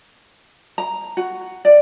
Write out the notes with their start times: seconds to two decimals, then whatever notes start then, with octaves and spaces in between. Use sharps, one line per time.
0.78 A#5
1.17 F#4
1.65 D5